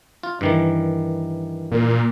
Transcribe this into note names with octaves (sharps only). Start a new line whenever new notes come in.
F4
G2 D#3 E3
A#2